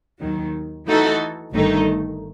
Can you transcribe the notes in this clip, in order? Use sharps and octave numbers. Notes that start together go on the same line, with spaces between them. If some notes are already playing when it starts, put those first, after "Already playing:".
D#2 D#3 F#3
E3 A3 D#4 F#4 A4
G1 G2 D#3 A3 D#4